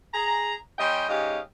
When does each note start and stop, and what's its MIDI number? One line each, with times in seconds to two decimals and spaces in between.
0.14 0.54 68
0.14 0.54 82
0.78 1.07 55
0.78 1.07 61
0.78 1.07 75
0.78 1.07 79
0.78 1.07 84
1.09 1.39 44
1.09 1.39 61
1.09 1.39 67
1.09 1.39 75
1.09 1.39 77